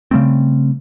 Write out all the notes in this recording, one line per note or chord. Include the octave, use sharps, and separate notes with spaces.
C#3 G3 A3 C4